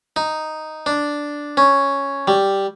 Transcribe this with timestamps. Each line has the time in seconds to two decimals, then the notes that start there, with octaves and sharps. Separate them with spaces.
0.16 D#4
0.86 D4
1.57 C#4
2.28 G3